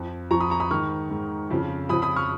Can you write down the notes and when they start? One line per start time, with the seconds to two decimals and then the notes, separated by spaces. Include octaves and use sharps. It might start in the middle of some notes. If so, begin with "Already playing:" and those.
Already playing: F2 F3
0.31 F2 F3 A#5 C#6
0.41 B5 D#6
0.50 A#5 C#6
0.60 B5 D#6
0.71 G#2 D#3 C#6 F6
1.10 G#2 D#3
1.50 F2 C#3 F3
1.89 F2 C#3 F3 B5 D#6
2.02 B5 D#6
2.16 C#6 F6